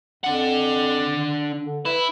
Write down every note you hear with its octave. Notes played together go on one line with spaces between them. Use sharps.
F2 D4 F#5
D3
E4 B4